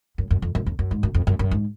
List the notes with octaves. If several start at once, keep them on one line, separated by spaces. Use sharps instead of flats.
F#2
F#2
F2
F#2
F2
F#2
G#2
F#2
F2
F#2
F#2
G#2